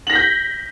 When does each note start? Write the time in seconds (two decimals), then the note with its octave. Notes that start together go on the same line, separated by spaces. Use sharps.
0.07 F#7
0.10 A#6
0.12 B6
0.15 G6